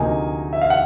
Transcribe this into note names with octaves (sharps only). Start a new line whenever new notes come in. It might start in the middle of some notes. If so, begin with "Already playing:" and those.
Already playing: D2 C3 F3 A#3 D#4 G#5
E5
F5
F#5